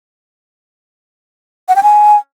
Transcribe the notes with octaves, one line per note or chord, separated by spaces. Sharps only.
F#5
G5
G#5